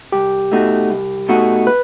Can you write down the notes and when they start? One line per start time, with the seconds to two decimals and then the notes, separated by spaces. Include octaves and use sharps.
0.12 C2 G4
0.52 B2 A3 D#4 F#4
0.90 C2
1.29 B2 A3 D#4 F#4
1.67 B4